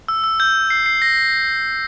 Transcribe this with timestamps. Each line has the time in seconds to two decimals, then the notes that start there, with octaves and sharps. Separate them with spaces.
0.08 E6
0.24 E6
0.40 G6
0.70 C7
0.86 C7
1.02 A#6
1.18 C7